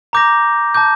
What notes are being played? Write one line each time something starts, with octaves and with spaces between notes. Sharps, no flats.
A#5 D6 G6 A#6
A5 D6 G6